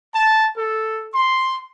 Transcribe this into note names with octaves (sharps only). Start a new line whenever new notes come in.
A5
A4
C6